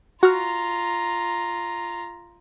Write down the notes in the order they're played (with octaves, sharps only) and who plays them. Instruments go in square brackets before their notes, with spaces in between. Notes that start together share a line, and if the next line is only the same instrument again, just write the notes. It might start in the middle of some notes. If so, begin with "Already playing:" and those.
[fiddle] F4 A#5 [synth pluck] F#4 F6